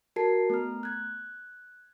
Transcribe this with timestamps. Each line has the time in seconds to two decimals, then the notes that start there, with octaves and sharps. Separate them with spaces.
0.16 F#4 A#4 A5 C7
0.50 A3 B3 A#5 F6
0.83 F#6 G#6